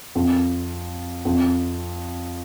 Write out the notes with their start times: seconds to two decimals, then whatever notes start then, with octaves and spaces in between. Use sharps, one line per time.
0.15 F2
1.25 F2